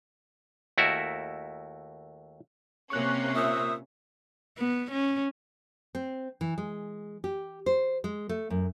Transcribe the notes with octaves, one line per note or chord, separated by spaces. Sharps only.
D#2 A3 E4 F#4 A#4 E5
C3 A#3 C#4 C#6 F#6
A#2 C5 E5 D#6
B3
C#4
C4
E3
G#3
G4
C5
G#3
A3
F#2